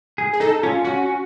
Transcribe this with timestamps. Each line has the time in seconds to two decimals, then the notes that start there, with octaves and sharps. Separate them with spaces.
0.18 G#4
0.33 G#4
0.40 D#4 A4
0.63 C#4 F4
0.85 C#4 F#4